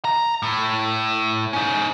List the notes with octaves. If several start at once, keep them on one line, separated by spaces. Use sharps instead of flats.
A#5
A2
C#4 D#4